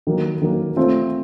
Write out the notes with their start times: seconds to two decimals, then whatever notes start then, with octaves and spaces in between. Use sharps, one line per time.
0.07 D#3 F#3 A#3
0.42 D#3 F#3 A#3
0.76 A3 C4 F4